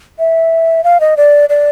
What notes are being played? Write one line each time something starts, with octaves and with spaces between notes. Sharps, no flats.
E5
F5
D#5
D5
D5